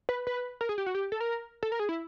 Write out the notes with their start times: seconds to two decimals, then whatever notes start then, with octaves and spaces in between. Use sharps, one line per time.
0.09 B4
0.27 B4
0.61 A#4
0.69 G#4
0.78 G4
0.86 F#4
0.95 G4
1.12 A4
1.21 A#4
1.63 A4
1.72 A#4
1.80 G#4
1.89 E4